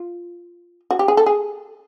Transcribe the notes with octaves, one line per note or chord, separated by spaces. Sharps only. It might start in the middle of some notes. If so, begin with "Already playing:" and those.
Already playing: F4
F#4
G4
G#4
A4
G#4